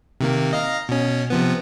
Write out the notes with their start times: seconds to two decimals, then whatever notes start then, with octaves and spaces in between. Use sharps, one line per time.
0.21 C3 D#3 A#3
0.53 D#5 F5 A#5
0.89 B2 C#4
1.30 C3 F3 B3